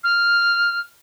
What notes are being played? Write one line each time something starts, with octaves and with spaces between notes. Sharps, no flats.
F6